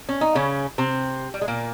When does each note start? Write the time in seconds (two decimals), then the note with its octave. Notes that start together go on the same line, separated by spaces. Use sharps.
0.09 C#4
0.21 D#4
0.35 C#3 C#4
0.78 C3 C4
1.34 G3
1.41 G#3
1.48 A#2 A#3